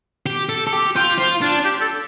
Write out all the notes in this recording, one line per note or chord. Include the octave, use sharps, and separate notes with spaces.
G4
A4
A4
G4
F4 G5
F4 C5
D4 F4
G4
A4